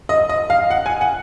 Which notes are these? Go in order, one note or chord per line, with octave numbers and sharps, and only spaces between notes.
D#5
D#5
F5
F#5
G#5
F#5